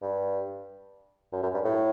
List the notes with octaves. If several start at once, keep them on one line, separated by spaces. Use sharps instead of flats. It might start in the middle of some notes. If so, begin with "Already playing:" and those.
G2
F#2
F#2
G2
A2